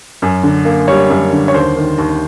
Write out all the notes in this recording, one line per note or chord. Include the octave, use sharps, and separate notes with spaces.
F#2
D3
A#3
G3 C#5
F#2
D3
C#5
D#2 C5
D#3
D#2